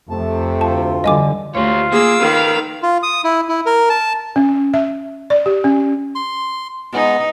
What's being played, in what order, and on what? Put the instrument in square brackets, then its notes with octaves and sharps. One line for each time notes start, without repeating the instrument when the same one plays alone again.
[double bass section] F2 [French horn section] C3 A3 [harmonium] A5
[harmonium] D2 F4 [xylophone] A5
[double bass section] D3 E3 G3 [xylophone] D#5 G#5 D6
[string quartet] D2 [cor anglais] F4 [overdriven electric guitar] G4 C#5
[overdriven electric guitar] A#3 [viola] G#4 [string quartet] D6 E6
[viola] D#3 F5 [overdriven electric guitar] A#4 B4
[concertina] F4
D#6
E4
E4
A#4
A5
[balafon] C#4
E5
D5
G4
C#4
[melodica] C6
[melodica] G#3 B3 [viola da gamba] D#4